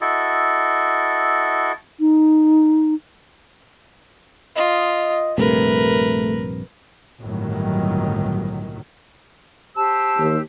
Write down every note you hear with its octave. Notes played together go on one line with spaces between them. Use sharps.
E4 F#4 A4 D#5
D#4
F4 D#5
A#1 G2 C3 A3 A#4 B4
G1 C2 A2 D#3 F#3
G4 C5 A5 E6
D#2